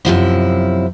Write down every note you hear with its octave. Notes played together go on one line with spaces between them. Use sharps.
F#2 C3 F3 E4